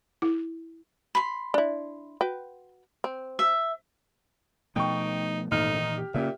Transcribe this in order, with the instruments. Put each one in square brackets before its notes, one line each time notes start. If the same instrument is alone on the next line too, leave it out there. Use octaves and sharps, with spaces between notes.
[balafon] E4
[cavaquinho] B5 C6
[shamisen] D4 E4
F#4 B4 G5
C4
[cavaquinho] E5
[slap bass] B2 F3 A3 [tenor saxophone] D#4 [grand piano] G5 C#6
[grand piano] G#1 A3 F6 [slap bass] A#2 E3 [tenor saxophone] D#4
[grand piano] D#3
G4
[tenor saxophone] A#2 [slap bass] C#3 A#3 C#4 [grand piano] G4 E5